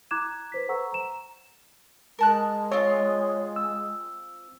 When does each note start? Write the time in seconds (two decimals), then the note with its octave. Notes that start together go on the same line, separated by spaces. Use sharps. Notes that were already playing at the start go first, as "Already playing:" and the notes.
0.11 E4 A#5 D6 F#6 G#6 E7
0.52 B4 C5 B6
0.68 A4 C5 F#5 A#5 C#6 E6
0.92 A#5 E7
2.19 G#3 A#4 A5 F#6
2.72 C4 F4 C#5
3.56 E6